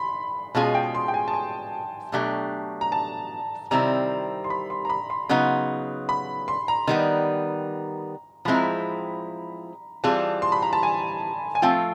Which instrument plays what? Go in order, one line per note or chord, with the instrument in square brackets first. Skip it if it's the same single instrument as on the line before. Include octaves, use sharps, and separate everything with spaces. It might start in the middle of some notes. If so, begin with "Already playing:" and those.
Already playing: [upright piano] B5 C6
[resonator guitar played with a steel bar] B2 G#3 C#4 F4 G#4 [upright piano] A5
[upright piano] G5
C6
G5
G#5
A5
G#5
[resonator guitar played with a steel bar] B2 F#3 A3 D4 G4
[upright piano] A#5
A5
[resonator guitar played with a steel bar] C3 D#3 G3 C4 E4 [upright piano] A#5
[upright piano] C6
B5
C6
A#5
B5
C6
[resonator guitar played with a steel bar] C#3 F#3 B3 D#4
[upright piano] B5
C6
A#5
[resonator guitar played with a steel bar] D#3 G3 B3
[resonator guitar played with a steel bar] F3 G#3 C4 E4 [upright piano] B5
[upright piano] A#5
B5
[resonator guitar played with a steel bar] E3 G3 C4 F4 G#4 [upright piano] A5
[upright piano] C6
B5
A#5
A5
G#5
G#5
[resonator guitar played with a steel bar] F3 A3 C4 F4 [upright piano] G5